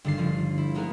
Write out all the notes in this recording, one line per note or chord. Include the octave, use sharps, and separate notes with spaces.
G1 D3 D#3 A6 C7
D3 F3
E4
G#3 A#3 B3 D#4 A#4